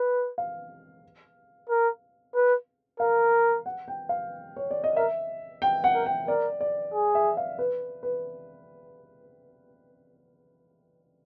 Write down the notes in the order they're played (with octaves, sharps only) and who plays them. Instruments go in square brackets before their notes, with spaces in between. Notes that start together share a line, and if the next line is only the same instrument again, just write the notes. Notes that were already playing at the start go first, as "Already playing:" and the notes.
Already playing: [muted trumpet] B4
[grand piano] F5
[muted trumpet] A#4
B4
[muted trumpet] A#4 [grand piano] F5
[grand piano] F#5
G5
F5
C#5
D5
D#5
[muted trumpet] A#4 [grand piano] E5
[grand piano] G5
F#5
[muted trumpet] A#4
[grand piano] G5
[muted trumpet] A#4 [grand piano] D5
[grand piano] D5
[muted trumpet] G#4
[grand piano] E5
F5
B4
B4